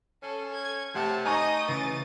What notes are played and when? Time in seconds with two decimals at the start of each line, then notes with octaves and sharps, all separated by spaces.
0.23 C#4 A4 C7
0.53 G#6
0.95 C3 A3 C5 F#5 A5
1.25 D#4 D#5 G#5 A#5 C#6 D#6
1.68 C#3 E3 A6 D#7